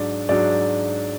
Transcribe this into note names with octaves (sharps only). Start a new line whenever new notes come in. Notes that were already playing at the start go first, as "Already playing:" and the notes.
Already playing: G#2 F#3 D4 D5
G#2 F#3 D4 D5